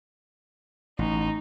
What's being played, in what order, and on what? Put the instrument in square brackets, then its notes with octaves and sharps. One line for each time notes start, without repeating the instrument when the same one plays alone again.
[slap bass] A1 [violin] D#4